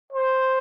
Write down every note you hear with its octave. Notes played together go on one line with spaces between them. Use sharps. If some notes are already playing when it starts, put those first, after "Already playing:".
C5